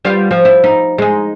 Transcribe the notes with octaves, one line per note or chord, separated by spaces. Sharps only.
G3 B3 F4
F3
E4
D#4
G#3 D#4